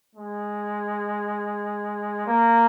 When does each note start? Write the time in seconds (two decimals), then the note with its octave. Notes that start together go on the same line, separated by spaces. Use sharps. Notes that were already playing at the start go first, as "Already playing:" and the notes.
0.15 G#3
2.27 A#3